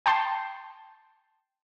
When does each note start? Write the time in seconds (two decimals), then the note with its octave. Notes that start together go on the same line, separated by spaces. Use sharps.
0.06 G5 A5 C6